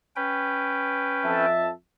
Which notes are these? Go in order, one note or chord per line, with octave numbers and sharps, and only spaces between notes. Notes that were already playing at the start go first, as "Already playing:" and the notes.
C#4 B4 G5
F2 E5 A5